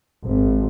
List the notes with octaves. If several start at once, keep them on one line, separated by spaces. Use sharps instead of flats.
G#1